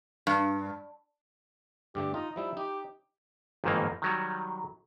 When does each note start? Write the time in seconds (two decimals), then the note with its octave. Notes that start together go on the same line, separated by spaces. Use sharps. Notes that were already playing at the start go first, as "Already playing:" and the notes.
0.27 G2
1.95 G2 D3 A3 G4
2.14 D#4 F4
2.36 F3 G3 D#4 E4
2.57 D#4 G4
3.64 G1 F2 G#2 D#3 E3 A#3
4.02 D#3 F#3 G3